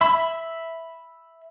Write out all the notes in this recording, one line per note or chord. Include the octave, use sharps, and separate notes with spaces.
E5 B5